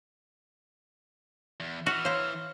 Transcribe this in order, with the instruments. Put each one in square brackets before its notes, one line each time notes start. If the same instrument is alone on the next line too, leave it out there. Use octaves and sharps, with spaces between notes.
[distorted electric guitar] E2
[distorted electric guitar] E3 [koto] F#4 [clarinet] F6
[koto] C5 A#5 [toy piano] C#5 F5